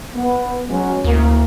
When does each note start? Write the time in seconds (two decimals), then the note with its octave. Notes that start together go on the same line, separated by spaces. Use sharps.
0.15 B3
0.68 F#3 G#3 C#4
1.04 D2 A2 A#3 A#4